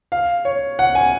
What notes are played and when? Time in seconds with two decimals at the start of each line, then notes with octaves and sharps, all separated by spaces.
0.12 F5
0.45 C#5
0.79 F#5
0.95 G#5